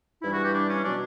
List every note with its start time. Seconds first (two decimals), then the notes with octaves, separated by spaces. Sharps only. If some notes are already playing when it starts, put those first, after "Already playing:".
0.22 G2 E3 G3 E4
0.33 F#4
0.43 G4
0.53 D4
0.68 C#4
0.84 B2 F#3 D4